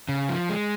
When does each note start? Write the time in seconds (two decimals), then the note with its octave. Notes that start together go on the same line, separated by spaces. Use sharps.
0.09 C#3
0.29 F3
0.49 G#3